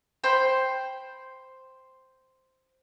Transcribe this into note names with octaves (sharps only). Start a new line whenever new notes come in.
C5 G5 B5